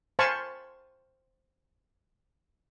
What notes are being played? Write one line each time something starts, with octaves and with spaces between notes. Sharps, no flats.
C5 F5 G#5 A5 B5 C#6